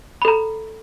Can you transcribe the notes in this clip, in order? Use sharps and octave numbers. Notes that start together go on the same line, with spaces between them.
A4 A#5 B5